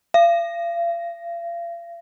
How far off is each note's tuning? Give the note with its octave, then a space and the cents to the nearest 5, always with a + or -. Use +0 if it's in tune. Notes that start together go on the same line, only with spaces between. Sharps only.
F5 -40